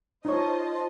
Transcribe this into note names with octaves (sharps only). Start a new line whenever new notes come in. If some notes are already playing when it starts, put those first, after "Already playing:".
D#4 F4 C5 C#5 D#5 A5